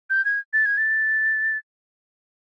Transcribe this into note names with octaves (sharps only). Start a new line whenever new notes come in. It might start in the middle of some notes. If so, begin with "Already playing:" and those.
G6
G#6
A6
G#6
A6